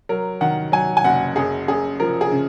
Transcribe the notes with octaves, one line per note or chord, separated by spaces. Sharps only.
F#3 A#4
D#3 F#5
F#3 G#5
G#5
F#1 F#5
F#2 G#4
F#2 G#4
F3 A#4
G#4
C#3